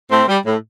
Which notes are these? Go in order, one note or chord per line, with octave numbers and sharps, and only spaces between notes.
A2 A3 C4
G3
A2